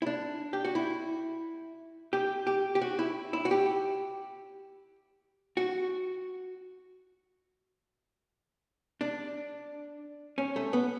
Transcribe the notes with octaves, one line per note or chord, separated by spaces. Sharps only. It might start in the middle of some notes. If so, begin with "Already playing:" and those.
E4
D4
G4
F#4
E4
G4
G4
G4
F#4
E4
E4
F#4
G4
F#4
D4
C#4
A3
B3